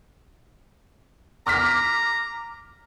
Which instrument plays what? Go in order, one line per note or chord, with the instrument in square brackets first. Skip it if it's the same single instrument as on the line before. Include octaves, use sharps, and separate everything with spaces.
[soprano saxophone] A#5 [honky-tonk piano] D6 F6 B6